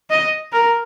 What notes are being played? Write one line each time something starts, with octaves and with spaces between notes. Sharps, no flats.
D#5
A#4